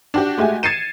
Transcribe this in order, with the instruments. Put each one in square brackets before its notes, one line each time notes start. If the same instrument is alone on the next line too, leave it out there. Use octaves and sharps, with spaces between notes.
[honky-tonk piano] D4 F#4 G4
G#3 A3 F#4 G4 G#5
G#6 A6 C7 C#7 D#7 E7